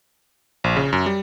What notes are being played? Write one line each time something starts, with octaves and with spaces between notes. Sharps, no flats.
A#1
C#3
F#2
G3